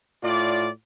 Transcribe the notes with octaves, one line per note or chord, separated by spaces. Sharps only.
A2 F4 D5